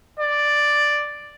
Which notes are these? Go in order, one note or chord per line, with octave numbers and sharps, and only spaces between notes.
D5